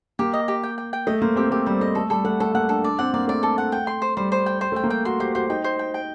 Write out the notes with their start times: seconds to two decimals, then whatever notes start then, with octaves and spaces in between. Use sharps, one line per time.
0.19 A#3 G4
0.33 D#5
0.48 G4
0.64 G5
0.78 G5
0.93 G5
1.07 A3 D#5
1.22 A#3 C5
1.36 C4 G4
1.51 A3 G4
1.66 G3 C5
1.81 A3 D#5
1.95 A3 A4
2.10 G3 A4
2.25 A3 F#5
2.40 A3 A4
2.54 A#3 F#5
2.69 D4 A4
2.84 D4 D5
2.99 C4 F#5
3.14 A#3 D5
3.28 A3 D5
3.43 A4
3.58 F#5
3.72 G5
3.87 C6
4.02 C5
4.17 G3 C5
4.32 C5
4.46 G5
4.61 C5
4.72 A3
4.76 G5
4.84 A#3
4.90 G5
5.05 F#4 C6
5.20 G4 C5
5.35 F#4 C5
5.46 F#4
5.50 D#4 G5
5.64 C5
5.79 G5
5.94 G5